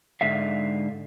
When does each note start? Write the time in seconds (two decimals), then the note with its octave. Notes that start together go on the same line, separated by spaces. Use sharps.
0.21 G#2 D3 E5 F5